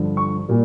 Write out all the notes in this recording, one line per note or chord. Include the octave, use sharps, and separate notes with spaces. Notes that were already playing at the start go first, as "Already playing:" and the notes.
Already playing: G2 D3 F3
C#6
A#2 G3 A#3